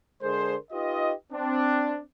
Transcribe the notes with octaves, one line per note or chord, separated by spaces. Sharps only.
D3 G#3 G#4 A#4 C5
D#4 F4 G4 B4 D#5
C4 D4